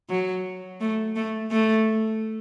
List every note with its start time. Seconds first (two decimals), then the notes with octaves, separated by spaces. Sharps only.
0.10 F#3
0.81 A3
1.16 A3
1.51 A3